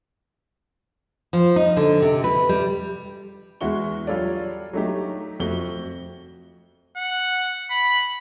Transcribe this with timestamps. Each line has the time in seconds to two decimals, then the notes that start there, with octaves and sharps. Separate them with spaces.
1.33 F3
1.56 D#4
1.77 D3
2.02 C3
2.24 B4
2.49 G3
3.61 E2 G#3 F#4 E5 C#6 G7
4.07 F#3 G3 F4 A4 C#5 D5
4.73 F#3 A3 D#4 G4
5.40 F2 A3 F#4 G7
6.97 F#5
7.70 B5